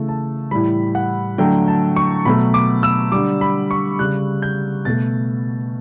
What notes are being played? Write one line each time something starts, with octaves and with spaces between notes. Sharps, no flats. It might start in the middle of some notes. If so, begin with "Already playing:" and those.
Already playing: C#3 E3 A3
A5
A2 E3 G3 B5
F#5
D3 F#3 A3 G5
A5
C#6
B2 F#3 A3 B5
D6
E6
D3 G3 D6
B5
C#6
C#3 G3 F#6
G6
B2 A3 A6